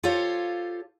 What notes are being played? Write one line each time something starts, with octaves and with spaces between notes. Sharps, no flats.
F4 G4 A4 C5 C#5 F5